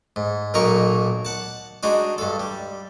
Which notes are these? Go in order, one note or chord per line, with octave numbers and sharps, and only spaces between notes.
G#2
B1 A#2 A#3 D#4 A#4 C#6
F#5 A5
G#3 D4 D#4 F#4
G2 A4
G3